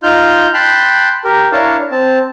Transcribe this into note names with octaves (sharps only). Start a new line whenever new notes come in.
D#4 F4 F6 G6
G5 A5 B5 C6 F#6
G4 A#4
D4 E4 A#4 C#5 F5 A5
C4 A5